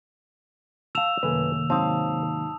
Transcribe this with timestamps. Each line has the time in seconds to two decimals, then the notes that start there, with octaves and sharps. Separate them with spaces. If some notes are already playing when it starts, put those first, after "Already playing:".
0.95 F5 A5 E6 E7 F7
1.23 F#2 C3 D#3 A3 A#3 B4 G#5
1.70 G#2 F#3 C4 F5 A5 D#6